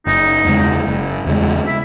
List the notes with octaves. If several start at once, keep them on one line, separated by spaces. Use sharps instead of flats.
F#1 D#4
E2 C#3 G#3
F#1
E2 C#3 G#3
E4